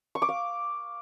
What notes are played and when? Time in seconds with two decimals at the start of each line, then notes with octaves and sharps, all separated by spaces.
0.15 C#6
0.22 D6
0.29 F5